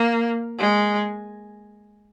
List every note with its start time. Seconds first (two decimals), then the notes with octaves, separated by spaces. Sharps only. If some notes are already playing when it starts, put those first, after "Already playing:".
Already playing: A#3
0.58 G#3